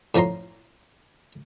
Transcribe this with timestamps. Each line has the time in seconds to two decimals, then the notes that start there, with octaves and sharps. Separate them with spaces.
0.15 A2 F3 C#4 A#5 C6